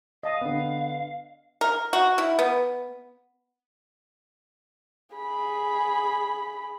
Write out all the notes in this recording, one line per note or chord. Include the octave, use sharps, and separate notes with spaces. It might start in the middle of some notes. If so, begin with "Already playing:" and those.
D#5 F5 A5 D#6
D3 B3
A#4
F#4
E4
B3
G#4 B5